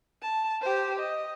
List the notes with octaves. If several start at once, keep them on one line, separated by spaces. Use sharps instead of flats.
A5
G4 C5
D#5